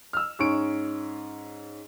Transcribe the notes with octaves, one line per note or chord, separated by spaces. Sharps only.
E6 F6
G#2 C#4 C#6 D7